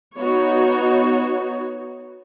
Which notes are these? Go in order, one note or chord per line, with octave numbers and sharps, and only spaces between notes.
B3 D#4 F#4 C#5